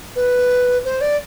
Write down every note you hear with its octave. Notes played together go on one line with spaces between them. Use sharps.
B4
C5
D5